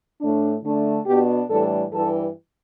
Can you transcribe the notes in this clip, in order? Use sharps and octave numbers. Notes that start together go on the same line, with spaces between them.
A2 A3 D4
D3 A3 D4
B2 B3 D4 G4
A2 E3 G3 D4 A4
G2 E3 G3 A4